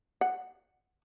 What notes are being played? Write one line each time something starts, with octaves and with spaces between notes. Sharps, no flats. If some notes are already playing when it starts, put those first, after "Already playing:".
F#5